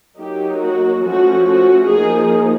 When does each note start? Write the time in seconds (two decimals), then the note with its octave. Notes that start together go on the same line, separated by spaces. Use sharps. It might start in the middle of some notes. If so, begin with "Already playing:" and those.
0.18 F#3 A#3 D#4 G4
0.60 F#4
1.03 F3 A3 C#4 F#4
1.46 F#4
1.88 F3 A#3 D#4 G#4